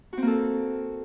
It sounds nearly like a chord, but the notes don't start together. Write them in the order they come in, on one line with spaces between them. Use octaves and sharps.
F#4 C4 A#3 A4